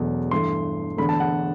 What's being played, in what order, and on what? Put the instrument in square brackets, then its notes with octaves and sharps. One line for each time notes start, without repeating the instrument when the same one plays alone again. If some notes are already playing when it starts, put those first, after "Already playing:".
Already playing: [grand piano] E1 E2 B2 F#3 A3
G2 E3 A3 C6
E1 E2 D3 A3 B5
A5
F#5